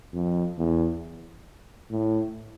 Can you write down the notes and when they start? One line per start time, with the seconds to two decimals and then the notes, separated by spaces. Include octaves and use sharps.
0.14 F2
0.58 E2
1.91 A2